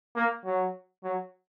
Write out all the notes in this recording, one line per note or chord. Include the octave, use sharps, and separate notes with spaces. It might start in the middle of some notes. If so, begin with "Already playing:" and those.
A#3
F#3
F#3